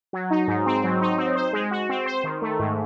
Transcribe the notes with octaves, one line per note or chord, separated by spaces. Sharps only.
F#3
D#4
G#2
C4
F#3
D#4
C4
C5
G#3
F#4
C4
C5
D#3
A3
G#2